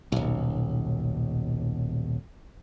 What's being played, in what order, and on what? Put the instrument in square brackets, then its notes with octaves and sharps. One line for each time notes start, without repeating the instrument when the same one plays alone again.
[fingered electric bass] D#1 B1